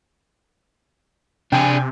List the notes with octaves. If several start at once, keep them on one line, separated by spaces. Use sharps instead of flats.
C3 D4 G#4 G5 G#5